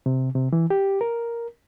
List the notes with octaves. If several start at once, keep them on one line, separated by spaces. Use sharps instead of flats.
C3
C3
E3
G4
A#4